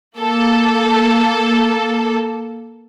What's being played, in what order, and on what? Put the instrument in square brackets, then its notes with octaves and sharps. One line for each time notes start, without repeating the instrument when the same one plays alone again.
[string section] A#3 A4